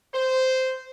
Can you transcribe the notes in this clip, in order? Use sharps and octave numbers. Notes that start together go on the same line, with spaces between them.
C5